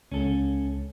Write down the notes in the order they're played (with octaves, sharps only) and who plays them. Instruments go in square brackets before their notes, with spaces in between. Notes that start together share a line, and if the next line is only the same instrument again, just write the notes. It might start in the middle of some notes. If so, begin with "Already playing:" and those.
[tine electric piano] C#2 [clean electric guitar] C#4 A4